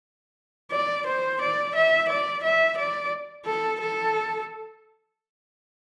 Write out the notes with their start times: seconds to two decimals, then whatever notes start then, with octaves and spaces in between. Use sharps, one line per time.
0.72 D5
1.07 C5
1.41 D5
1.75 E5
2.09 D5
2.43 E5
2.77 D5
3.45 A4
3.80 A4